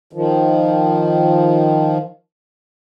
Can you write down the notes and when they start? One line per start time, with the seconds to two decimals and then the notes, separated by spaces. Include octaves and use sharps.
0.13 D#3 F3